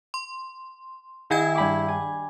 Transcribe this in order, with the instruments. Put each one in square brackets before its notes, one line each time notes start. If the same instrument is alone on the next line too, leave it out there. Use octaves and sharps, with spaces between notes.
[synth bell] C6
[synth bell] D#3 G5 G#6 [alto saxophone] E4 [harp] D#5 G#5
[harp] G2 B5 D6
G#5